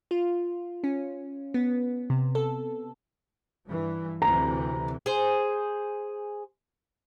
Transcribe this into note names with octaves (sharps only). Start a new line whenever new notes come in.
F4
C#4
B3
C3
A4
G2 E3
D2 C3 E3 A#5
G#4 C5